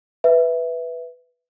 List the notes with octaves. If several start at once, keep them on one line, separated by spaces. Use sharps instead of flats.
B4 E5